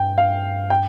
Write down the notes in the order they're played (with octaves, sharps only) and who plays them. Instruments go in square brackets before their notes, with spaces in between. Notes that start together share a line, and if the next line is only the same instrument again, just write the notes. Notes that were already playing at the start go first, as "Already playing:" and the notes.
Already playing: [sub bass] G2 [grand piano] G5
[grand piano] F5
G5